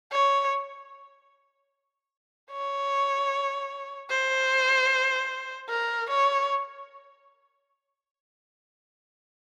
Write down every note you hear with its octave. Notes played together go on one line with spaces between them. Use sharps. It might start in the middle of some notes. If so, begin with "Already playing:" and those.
C#5
C#5
C5
A#4
C#5